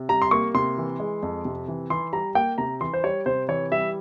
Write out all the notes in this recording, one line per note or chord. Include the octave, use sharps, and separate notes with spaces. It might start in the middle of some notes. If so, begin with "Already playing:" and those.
Already playing: C3
G3 A#5
C6
A#3 C#6
C3 C6
E3
G#3
F2
C3
E3
E3 C6
G3 A#5
A#3 G5
C3 A#5
E3 C6
C5
G3 C#5
C3 C5
E3 C#5
G3 E5